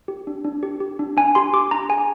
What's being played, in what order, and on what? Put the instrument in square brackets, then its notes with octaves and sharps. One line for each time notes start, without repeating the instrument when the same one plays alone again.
[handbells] G4
D4
D4
G4
G4
D4
D4 G#5
G4 C6
G4 D6
D4 A#5
G#4 G#5